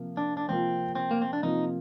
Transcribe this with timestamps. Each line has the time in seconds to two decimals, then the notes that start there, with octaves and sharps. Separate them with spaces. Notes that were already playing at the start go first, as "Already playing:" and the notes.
Already playing: C3 F3 A#3
0.17 D4
0.37 D4
0.49 C3 F3 A#3 C4 F4
0.95 C4
1.11 A#3
1.22 C4
1.33 D4
1.43 C3 F3 A#3 D#4 F4